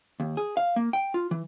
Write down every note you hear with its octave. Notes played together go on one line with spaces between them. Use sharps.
D#2
G#4
F5
A#3
G5
F4
E3